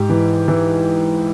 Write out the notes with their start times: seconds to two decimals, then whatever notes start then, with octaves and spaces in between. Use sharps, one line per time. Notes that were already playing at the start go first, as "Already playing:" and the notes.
Already playing: G#2 G4
0.09 E3
0.48 E3 E4